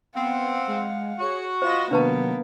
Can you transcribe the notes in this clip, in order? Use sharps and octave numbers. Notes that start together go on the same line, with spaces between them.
B3 C4 F5 F#5
G#3
F#4 G#4 C#5 C#7
F4 C5 D#5 B5 A#6 E7
C3 D#3 F#3 A#3 B3 D4 B4 A5